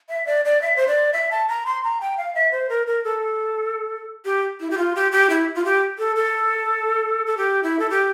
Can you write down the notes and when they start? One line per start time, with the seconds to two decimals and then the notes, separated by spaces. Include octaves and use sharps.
0.09 E5
0.27 D5
0.45 D5
0.62 E5
0.76 C5
0.88 D5
1.13 E5
1.31 A5
1.48 A#5
1.66 C6
1.83 A#5
2.01 G5
2.18 F5
2.35 E5
2.52 C5
2.69 A#4
2.87 A#4
3.04 A4
4.25 G4
4.60 E4
4.71 G4
4.78 F4
4.96 G4
5.12 G4
5.30 E4
5.55 F4
5.65 G4
5.99 A4
6.16 A4
7.26 A4
7.37 G4
7.63 E4
7.79 A4
7.90 G4